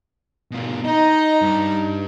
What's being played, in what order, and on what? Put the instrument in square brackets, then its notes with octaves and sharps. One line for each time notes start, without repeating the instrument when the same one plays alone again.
[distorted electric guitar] B2 F4
[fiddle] D#4 [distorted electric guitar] D#5
[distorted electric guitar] G2